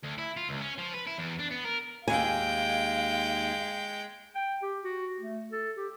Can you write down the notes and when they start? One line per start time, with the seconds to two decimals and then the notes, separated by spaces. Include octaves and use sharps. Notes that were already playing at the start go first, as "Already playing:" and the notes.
0.04 D2
0.18 E4
0.37 F4
0.49 C#2
0.61 C#4
0.78 F3
0.94 B4
1.07 E4
1.18 E2
1.40 D4
1.52 B3
1.65 A#4
2.08 D#2 G#3 F5 G5 G#5
4.35 G5
4.62 G4
4.84 F#4
5.20 A3
5.52 A4
5.77 G4